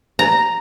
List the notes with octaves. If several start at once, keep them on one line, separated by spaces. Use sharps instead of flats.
A#5